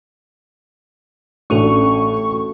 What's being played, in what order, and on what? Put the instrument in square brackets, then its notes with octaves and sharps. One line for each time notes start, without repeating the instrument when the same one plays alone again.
[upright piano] A1 D4 [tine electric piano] A3 F#4 A4 [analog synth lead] C#6